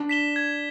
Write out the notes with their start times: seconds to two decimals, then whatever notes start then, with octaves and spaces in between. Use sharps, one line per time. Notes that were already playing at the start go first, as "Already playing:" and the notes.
Already playing: D4
0.09 B6 E7 G7
0.36 G#6